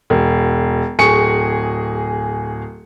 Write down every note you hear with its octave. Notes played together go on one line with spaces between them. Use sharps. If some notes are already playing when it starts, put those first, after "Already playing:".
E1
D1 G#4 C#6 C#7